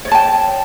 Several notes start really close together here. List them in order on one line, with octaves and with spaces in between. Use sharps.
C#5 D5 A5 G5